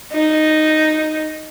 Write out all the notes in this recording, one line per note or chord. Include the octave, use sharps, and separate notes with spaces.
D#4